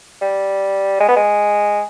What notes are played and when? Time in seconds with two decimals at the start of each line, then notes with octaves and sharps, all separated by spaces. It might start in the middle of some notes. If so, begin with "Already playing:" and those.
0.21 G3
1.00 G#3
1.09 B3
1.16 G#3